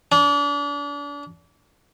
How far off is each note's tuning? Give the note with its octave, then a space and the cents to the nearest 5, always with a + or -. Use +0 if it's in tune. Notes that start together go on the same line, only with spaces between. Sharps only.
D4 -35